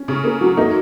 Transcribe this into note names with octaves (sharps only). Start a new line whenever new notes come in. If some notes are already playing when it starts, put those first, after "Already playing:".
Already playing: C#4
C#3
A#3
F#3
A#3 D#4